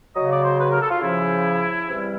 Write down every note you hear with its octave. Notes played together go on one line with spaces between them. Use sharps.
C#3 F#3 D#5
D5
C5
B4
A#4
A4
F4
C#3 F3 E4
C3 E3 G3